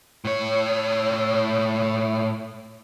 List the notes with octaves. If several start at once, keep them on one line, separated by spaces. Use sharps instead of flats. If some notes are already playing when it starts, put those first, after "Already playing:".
A2 C#5